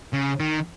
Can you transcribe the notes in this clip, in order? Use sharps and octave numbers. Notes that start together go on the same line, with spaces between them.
C#3
D#3